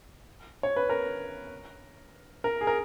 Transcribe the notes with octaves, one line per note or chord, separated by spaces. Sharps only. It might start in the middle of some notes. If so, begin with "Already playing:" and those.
C#5
B4
A#4
A#4
G#4
A#4